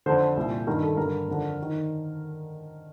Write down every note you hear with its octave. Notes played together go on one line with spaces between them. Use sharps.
F2 D3 C5
C2 A#2
G2 D#3 A#4
A4
G2 D3 A#4
F2 D3
D#3